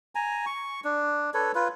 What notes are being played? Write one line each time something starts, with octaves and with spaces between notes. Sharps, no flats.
G#5 A#5
C#6
D4
A4 B4 C#5
F4 B4